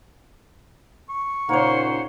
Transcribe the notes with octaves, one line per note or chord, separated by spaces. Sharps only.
C#6
A#2 C#3 A#3 D#4 C5 C#5 F#5